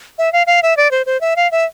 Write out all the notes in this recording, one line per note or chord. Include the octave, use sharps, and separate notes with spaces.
E5
F5
F5
E5
D5
C5
C5
E5
F5
E5